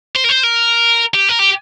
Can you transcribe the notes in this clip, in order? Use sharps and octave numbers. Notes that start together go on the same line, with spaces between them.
C5
A#4
C5
A#4
G4
A#4
G4